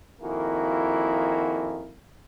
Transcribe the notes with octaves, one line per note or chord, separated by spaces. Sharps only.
F2 D#3 A#3 E4 F#4 G#4